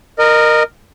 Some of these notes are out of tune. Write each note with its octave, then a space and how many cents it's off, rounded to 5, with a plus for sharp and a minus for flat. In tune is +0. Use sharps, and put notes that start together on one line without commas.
A#4 +0 D#5 -25